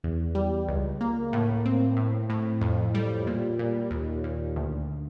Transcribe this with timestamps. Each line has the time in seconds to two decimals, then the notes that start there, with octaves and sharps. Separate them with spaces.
0.04 E2
0.35 G3
0.68 C#2
1.01 A#3
1.33 A2
1.65 C4
1.97 A2
2.30 A2
2.61 F2
2.95 G3
3.27 A#2
3.59 A#2
3.91 D#2
4.24 D#2
4.56 D2